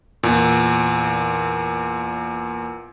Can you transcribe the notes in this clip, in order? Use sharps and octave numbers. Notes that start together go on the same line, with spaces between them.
E2 A#2